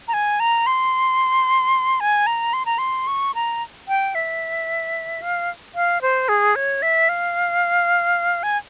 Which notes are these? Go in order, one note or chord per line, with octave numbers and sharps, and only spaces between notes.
A#5
G#5
A#5
C6
G#5
A#5
C6
A#5
C6
C#6
A#5
G5
E5
F5
F5
C5
G#4
C#5
E5
F5
G#5